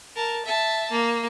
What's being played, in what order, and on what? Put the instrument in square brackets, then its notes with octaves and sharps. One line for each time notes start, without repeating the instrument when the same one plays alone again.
[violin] A#4 A5
E5 A5
A#3